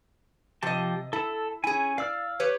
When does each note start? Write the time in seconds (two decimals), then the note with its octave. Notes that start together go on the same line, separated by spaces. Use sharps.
0.63 C3 F3 G4 D#5 A5
1.13 E4 A4 A5
1.64 C#4 E4 G#4 G#5
1.98 D5 F5 E6 F6
2.40 G4 B4 C#5